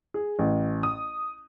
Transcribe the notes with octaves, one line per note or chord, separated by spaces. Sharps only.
G#4
A1
D#6